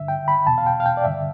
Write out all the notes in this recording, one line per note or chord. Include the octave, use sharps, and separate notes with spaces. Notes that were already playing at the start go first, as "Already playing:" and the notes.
Already playing: G2 D3 E5
G5
B5
E2 B2 A5
F5
G5
F5
G5
D5
G2 D3 E5